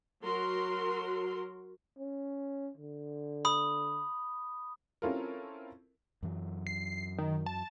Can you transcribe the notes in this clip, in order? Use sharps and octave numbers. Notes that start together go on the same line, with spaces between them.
F#3 F#4 A#4 C6
C#4
D3
B5 D#6
C4 C#4 E4 F4 A4 A#4
F#2 E3 F#3
C7
D#3
A5